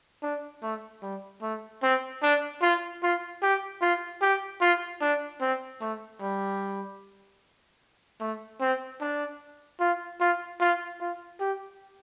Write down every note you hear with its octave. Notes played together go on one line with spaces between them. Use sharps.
D4
A3
G3
A3
C4
D4
F4
F4
G4
F4
G4
F4
D4
C4
A3
G3
A3
C4
D4
F4
F4
F4
F4
G4